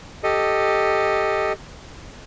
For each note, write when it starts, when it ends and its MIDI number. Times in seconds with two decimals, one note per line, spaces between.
0.23 1.53 67
0.23 1.53 69
0.23 1.53 75